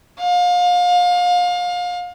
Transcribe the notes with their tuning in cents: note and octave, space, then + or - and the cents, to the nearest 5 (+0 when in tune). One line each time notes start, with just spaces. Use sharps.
F5 +30